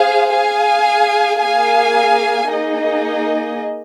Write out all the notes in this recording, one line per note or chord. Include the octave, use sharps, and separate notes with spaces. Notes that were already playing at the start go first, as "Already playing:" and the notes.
Already playing: G#4 C5 F5 G#5
G#4 F5 G#5
A#3 G#4 F5 G#5
A#3 D#4 G#4 D#5